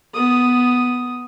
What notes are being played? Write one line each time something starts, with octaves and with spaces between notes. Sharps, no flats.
B3 D#6